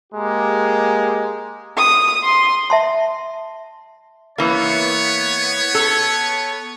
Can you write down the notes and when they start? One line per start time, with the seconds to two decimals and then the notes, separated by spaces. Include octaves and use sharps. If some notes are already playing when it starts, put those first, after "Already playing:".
0.13 G#3 A#3 G4 A#5
1.78 D#6
2.24 C6
2.70 E5 A5 C6
4.38 E3 A#3 B3 C#5
5.75 A4